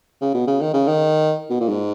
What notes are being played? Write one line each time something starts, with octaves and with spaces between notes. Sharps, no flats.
C#3
B2
C#3
D#3
C#3
D#3
B2
A#2
G#2